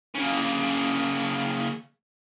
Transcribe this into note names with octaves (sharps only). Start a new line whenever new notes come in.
C#3 A#3